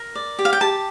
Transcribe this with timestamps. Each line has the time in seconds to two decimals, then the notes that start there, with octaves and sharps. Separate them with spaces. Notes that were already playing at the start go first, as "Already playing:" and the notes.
Already playing: A#4
0.15 D5
0.39 G4
0.45 F5
0.53 G5
0.61 G4 A5